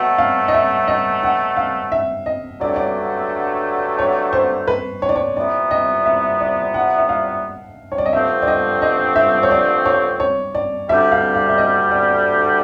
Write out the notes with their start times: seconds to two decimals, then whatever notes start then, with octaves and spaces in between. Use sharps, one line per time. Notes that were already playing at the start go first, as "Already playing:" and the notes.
Already playing: B2 F#3 A3 F#5
0.18 F5
0.48 D#5
0.54 E5
0.88 D#5
1.23 F#5
1.57 F5
1.92 E5
2.26 D#5
2.60 G2 D3 F#3 A3 D5
2.68 C#5
2.76 D5
3.99 C#5
4.33 C5
4.67 B4
5.02 C#5
5.09 D5
5.16 C#5
5.36 C2 A#2 G3 B3 E4 D5
5.71 D#5
6.06 E5
6.41 D5
6.74 F#5
6.98 E5
7.09 F5
7.92 C#5
7.98 D5
8.06 D#5
8.13 G2 D3 F3 A3 C4 E5
8.42 D5
8.47 D#5
8.82 D#5
9.16 E5
9.43 C#5
9.51 D5
9.85 C#5
10.20 C#5
10.55 D5
10.89 D2 D3 G3 E5
11.12 F5
11.35 F5
11.49 E5
11.58 D#5
11.92 D5